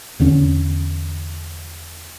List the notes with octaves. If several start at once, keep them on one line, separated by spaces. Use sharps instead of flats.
E2 D3 C#4